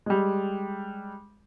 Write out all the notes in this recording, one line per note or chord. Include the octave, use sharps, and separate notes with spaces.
G3 G#3